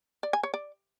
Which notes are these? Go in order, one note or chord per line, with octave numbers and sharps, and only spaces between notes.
D5
G#5
C#5
D5